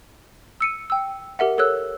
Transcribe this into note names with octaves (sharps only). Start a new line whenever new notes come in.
E6 C#7 D#7
G5 E6
G4 A#4 E5 F#5
G4 A4 A#4 C#5 E6 F#6